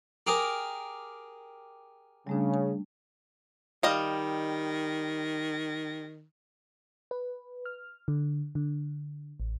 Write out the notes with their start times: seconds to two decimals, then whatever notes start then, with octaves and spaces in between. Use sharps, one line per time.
0.27 G4 G#4 A#4
2.27 C#3 G3 A3 D4
3.83 D#3 G3 D#5 F5
7.11 B4
7.65 F6
8.08 D3
8.55 D3
9.40 A1